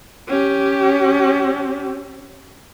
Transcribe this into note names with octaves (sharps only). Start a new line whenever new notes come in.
C#4 G4